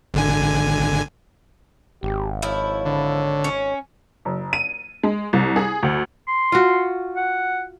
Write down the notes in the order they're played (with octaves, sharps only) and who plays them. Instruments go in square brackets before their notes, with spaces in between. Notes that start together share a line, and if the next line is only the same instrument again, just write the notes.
[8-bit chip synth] G#1 D3 G#5
[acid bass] G#1 [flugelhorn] G4
[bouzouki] F3 E4 [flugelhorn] C#5
[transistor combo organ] D3
[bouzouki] C#4
[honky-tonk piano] F#1
D#7
G#3
C2
G#4
D2
[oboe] C6
[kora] F4 F#4
[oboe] F#5